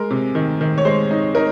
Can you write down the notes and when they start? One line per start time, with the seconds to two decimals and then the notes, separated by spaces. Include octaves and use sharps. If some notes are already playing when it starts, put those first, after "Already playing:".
Already playing: G#3 A#4
0.10 C3
0.35 D#3
0.61 D#3
0.78 C#5
0.85 G#3 C5
1.11 D#4
1.35 D#4 A#4